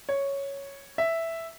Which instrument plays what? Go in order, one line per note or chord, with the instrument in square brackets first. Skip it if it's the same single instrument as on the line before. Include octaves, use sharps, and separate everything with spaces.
[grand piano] C#5
E5